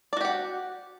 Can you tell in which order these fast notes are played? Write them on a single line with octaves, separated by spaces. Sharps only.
D5 F#4 G4 F#5